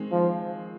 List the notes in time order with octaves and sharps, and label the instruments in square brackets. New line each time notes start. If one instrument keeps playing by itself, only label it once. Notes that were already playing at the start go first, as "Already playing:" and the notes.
Already playing: [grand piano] D#3 G#3 C4
[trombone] F3